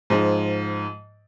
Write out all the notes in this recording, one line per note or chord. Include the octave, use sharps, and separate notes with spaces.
G#2 F3